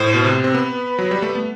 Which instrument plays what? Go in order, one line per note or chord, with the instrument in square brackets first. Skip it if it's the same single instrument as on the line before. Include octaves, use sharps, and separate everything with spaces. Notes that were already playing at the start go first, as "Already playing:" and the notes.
Already playing: [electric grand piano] A2 [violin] C5
[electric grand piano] B2
C3
C4
[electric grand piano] B3 [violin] B4
[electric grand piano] F#3
G3
A3
B3